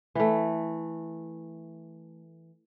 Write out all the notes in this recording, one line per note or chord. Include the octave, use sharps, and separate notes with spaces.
E3 A3